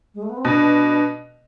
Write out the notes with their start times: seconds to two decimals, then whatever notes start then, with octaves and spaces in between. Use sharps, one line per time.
0.14 G#3
0.22 A3
0.29 B3
0.37 C4
0.44 B2 D4